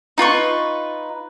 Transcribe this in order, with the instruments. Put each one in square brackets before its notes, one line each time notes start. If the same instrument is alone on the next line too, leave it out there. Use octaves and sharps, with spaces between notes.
[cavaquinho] D#4 F4 B4 C#6